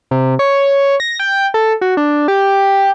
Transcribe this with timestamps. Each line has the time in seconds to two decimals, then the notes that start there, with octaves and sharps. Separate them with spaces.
0.11 C3
0.39 C#5
1.00 A#6
1.20 G5
1.54 A4
1.81 F#4
1.97 D4
2.28 G4